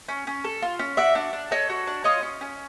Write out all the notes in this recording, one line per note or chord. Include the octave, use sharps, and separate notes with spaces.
C#4
C#4
A4
F4
C#4
F#4 D5 E5
D4
D4
A4 C#5 D#5
F#4
D4
F4 C#5 D#5
C#4
C#4